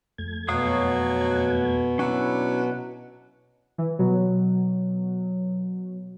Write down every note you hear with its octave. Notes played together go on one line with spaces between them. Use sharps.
F2 A3 G#6
B2 F#3 C#5 F5 D#6
F#3 C#4 D4 E4
E3
B2 F#3